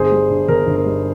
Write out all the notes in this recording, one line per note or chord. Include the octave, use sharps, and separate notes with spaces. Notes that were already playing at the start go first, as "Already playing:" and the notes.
Already playing: G1 G#4 C5
G3
G2
G1 A#4
G1
A#4
G3